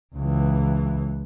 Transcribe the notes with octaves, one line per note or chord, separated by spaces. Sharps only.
C#2 E3